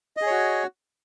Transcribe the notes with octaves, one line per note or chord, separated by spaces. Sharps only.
F#4 G#4 C#5 D#5